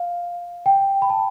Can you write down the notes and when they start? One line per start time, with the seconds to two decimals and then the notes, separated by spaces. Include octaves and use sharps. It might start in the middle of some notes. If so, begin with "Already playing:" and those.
Already playing: F5
0.66 G5
1.02 B5
1.10 A5